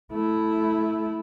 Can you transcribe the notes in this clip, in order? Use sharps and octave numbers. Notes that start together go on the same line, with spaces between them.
A3 E4